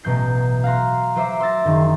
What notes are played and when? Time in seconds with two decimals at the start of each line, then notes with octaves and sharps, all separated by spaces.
0.03 A1 B2 F#3 G6 C7
0.63 F5 F#5 A#5 C6
1.16 F#3 C5 E5 D6 C7
1.40 C6 E6 A6 A#6
1.65 F#1 D#3